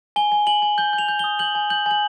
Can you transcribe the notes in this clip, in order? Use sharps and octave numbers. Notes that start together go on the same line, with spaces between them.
G#5 G7
G#5
G#5 F#7
G#5
G6 G7
G6
F7
G6
D#6 G7
G6 F#7
G#5
G6 F#7
G#5 F#7